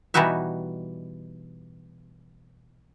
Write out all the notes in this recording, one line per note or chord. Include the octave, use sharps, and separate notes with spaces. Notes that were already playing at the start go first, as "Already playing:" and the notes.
B2 E3 G3 D#4 F#4 E5